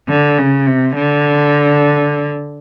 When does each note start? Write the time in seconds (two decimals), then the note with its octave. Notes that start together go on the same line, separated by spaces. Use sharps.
0.08 D3
0.38 C#3
0.66 C3
0.96 D3